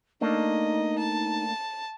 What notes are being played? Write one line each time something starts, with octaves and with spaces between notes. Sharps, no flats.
A3 A#3 D4 D#4 D#5
A5